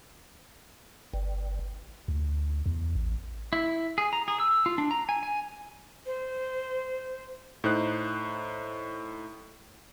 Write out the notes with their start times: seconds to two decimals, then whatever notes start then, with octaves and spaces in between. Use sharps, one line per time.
1.14 G1
2.08 D2
2.66 E2
2.95 A1
3.53 E4
3.98 G#4
4.13 A#5
4.28 G#4
4.40 E6
4.66 F4
4.78 D4
4.91 A#5
5.09 G#5
5.23 G#5
6.06 C5
7.64 A2 D#4 C5 F#6